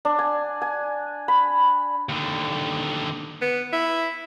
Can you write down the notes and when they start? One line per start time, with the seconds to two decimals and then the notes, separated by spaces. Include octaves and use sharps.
0.05 D4
0.19 G#5
0.62 G#5
1.28 B5
2.09 D#2 D3
3.41 B3
3.72 E4